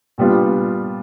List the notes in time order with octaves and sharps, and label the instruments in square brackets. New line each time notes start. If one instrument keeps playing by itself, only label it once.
[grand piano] A#2 G3 B3 D4 F4